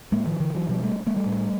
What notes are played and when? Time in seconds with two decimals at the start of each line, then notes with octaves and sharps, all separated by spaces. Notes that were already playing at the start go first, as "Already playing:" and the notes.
0.12 A2 G#3 A#3
0.26 D#3 F3
0.40 D3 E3
0.55 E3 F#3
0.69 B2 F3 G3
0.83 G3 A3
1.06 G#3 A#3
1.16 G3 A3
1.26 A2